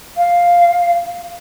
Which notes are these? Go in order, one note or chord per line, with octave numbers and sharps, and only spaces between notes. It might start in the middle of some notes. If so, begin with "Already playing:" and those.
F5